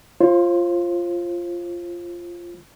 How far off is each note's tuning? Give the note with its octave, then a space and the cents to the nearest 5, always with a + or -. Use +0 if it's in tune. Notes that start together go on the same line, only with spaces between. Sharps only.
F4 -10 C5 +35